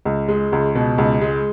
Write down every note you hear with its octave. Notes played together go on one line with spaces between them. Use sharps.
C#2
G#3
C#2
B2
C#2
G#3